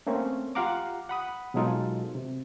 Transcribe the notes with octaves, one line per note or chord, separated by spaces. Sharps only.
A3 A#3 C4 C#4
F4 G4 F5 F#5 A#5 D6
F#5 B5 D#6
B2 F#3 G#3 D#4 F4 A4
C3